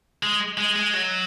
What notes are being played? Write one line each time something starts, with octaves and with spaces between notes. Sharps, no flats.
G#3
G#3
G#3
F#3